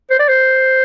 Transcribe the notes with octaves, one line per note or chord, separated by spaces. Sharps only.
C5
D5
C5